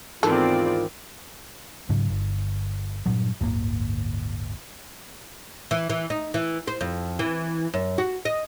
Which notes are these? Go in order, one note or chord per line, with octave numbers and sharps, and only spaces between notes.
E2 G#2 D#3 B3 C4 F4 A4 D5
G#2 C#3 F#3
G1
G2 A#2 F#3
D1 G1 A#3
E3
E3
D#4
E3
C5
F2
E3
F#2
F#4
D#5